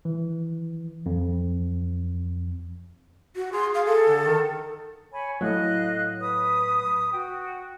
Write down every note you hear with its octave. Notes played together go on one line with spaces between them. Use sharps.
E3
F2
F#4
G#4 C6
F5
A4
D3
D#3
C#5 G#5 B5
A2 F#3 D#5 F5 F#6
B4 D#6
F#4 G5